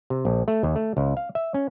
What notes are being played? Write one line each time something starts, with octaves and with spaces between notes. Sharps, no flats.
C3
A#1
A3
D#2
A3
C#2
F5
E5
C#4